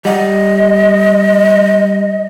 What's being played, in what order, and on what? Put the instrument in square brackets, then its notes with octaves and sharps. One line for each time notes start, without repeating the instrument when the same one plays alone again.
[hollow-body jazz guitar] G3 F#5 [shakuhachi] D#5